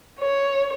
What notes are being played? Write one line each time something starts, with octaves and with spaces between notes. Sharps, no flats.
C#5